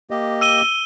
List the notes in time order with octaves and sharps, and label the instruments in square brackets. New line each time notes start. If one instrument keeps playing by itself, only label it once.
[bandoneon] A#3 G4 D#5
[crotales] E6 D#7 G7